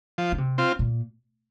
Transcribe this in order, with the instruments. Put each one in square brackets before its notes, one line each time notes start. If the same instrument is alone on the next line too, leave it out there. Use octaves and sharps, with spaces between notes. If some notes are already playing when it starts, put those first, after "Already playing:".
[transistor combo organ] F3
[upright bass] D3
C3
[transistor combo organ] C4 F4
[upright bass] A#2